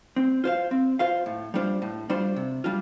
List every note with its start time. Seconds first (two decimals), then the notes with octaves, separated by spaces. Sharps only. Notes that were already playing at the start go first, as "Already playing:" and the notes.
0.16 C4
0.44 F4 C5 F5
0.71 C4
0.99 F4 C5 F5
1.26 A2
1.54 G3 D4 F4 C5
1.82 A2
2.10 G3 D4 F4 C5
2.36 C3
2.64 G3 D4 F4